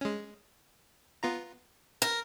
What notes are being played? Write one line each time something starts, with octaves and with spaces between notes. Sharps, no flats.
G#3 C#4
B3 F4 A#5
A#4